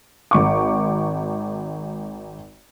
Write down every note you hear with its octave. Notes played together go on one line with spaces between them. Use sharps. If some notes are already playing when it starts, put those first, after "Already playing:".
G#1 C#6 D6